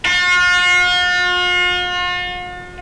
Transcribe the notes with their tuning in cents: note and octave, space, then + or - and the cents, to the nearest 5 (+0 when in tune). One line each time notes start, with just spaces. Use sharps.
F4 +45